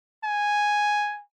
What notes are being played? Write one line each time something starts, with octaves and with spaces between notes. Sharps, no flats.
G#5